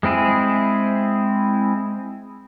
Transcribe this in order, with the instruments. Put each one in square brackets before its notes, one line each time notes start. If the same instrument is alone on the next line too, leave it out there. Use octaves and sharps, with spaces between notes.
[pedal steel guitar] G#3 C4 E4 G#4